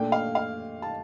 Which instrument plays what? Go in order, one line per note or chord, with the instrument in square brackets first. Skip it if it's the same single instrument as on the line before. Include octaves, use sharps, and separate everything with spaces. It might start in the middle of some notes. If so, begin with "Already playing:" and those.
Already playing: [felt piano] A#2 A3 D4 G5
F5
F5
A5